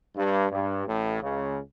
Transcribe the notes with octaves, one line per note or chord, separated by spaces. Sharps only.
G2
G2
A1 A2
C#2 C#3